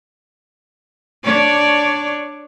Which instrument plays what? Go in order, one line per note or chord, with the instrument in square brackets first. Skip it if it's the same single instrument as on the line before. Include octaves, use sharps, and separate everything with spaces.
[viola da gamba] D4 C#5 D5